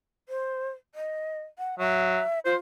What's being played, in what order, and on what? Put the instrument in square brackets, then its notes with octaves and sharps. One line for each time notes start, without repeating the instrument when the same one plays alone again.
[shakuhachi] C5
D#5
F#5
[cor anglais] F#3 [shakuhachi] E5
[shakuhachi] F4 [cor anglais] C5